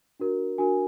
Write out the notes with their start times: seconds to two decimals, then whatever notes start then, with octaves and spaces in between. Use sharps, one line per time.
0.20 D4 F#4 A#4
0.58 D4 F#4 A#4 G#5